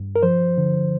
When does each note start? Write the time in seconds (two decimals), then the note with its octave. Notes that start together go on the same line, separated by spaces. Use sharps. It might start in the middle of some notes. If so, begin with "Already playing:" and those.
Already playing: G2
0.16 A#4
0.23 F3 C5
0.58 D3